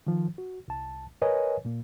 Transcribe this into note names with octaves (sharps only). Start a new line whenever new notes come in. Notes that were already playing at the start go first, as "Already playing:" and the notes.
D#3 F3
F#4
C2 A5
A#4 B4 C#5 D#5 G#5
A#2 A#3